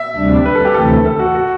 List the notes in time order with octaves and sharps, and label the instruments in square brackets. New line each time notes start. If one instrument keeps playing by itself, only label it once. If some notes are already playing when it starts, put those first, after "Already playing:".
Already playing: [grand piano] E5
[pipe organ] D2 C3 G3 D4
[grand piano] B4
A4
G4
[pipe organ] D2 C3 E3 A3 [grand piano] A4
[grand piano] A4
F#4
F#4